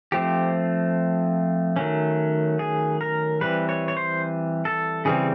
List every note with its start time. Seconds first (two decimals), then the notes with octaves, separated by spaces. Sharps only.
0.12 F3 A3 C4 G4
1.76 D#3 F#3 A3 C#4
2.59 G#4
3.01 A#4
3.41 E3 G3 C4 B4
3.69 C#5
3.88 C#5
3.97 C5
4.65 A4
5.05 C#3 E3 G3 C4 G#4